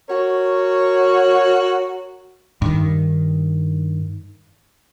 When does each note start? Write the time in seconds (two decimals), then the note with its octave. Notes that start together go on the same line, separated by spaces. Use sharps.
0.09 F#4 A#4 C#5
2.62 G2 D#3